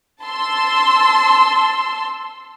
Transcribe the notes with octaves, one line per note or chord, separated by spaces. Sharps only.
A5 C6 E6